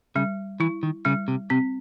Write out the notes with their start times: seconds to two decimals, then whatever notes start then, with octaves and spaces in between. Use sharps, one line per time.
0.15 C#3 G3
0.60 E3 E4
0.83 D#3
1.05 C#3 G3
1.28 C3
1.50 C3 C4